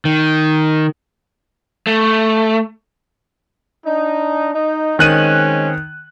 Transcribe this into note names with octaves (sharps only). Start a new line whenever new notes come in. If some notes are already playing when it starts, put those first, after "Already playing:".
D#3
A3
D4 D#4
D#4
D#3 G#3 C4 C#4 F#6 D#7